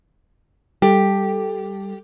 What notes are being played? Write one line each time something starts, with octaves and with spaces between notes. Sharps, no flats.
G3 G4 A4